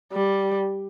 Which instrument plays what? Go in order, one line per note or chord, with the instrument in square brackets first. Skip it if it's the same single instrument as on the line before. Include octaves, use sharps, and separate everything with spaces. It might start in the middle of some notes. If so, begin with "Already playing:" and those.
[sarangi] G3